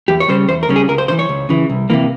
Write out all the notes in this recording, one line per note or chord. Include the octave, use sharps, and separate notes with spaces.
E2 G4
C#5
C#3 G3 C#4 C5
E2 C5
A#4
C#3 G3 C#4
G#4
C#2 A#4
C5
C#3 C5
E3
C#5
C#2
C#3 E3
C2
C3 E3 A#3